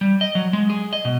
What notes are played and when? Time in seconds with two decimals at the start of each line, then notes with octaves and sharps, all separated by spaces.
0.01 G3
0.21 D#5
0.35 F#3
0.53 G#3
0.70 G#4
0.93 D#5
1.05 B2